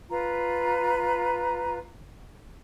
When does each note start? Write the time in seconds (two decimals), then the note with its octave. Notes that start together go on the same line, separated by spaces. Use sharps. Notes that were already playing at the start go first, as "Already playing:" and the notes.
0.10 F4 B4 A#5